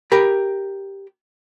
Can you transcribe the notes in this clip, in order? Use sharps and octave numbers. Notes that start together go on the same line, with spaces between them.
G4 A#4 B5